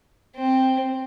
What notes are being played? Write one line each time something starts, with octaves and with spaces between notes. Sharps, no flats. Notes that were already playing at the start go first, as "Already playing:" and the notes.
C4